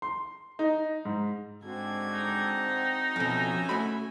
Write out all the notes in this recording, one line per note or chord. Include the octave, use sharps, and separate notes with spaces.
C6
D#4
G#2
G#2 D3 C4 F#4 G#6
D#4
F2 B2 C#4 E5 G#5
A3 F#4 B5